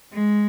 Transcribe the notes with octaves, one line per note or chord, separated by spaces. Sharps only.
G#3